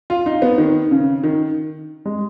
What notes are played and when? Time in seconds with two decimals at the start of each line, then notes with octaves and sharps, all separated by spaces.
0.10 F4
0.26 D#4
0.42 B3
0.58 D#3
0.91 C#3
1.24 D#3
2.05 G#3